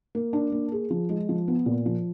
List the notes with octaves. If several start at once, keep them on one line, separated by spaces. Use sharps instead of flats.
A#3
D4
A#3
G#4
F3
G#3
F3
B3
A#2
F3